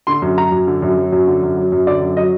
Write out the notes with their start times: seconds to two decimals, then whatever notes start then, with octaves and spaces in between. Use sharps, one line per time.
0.07 D3 C6
0.22 F#2
0.37 F#3 A#5
0.52 F#2
0.67 D3
0.82 F#2
0.98 F#3
1.12 F#2
1.27 D3
1.43 F#2
1.57 F#3
1.72 F#2
1.87 D3 D5
2.01 F#2
2.17 F#3 D#5